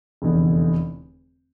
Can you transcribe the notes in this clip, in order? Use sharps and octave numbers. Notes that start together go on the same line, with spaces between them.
F1 E2 D3